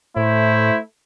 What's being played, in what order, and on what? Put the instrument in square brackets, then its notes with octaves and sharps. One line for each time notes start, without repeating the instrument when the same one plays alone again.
[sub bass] A2 [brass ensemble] A3 [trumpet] E4 [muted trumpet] C5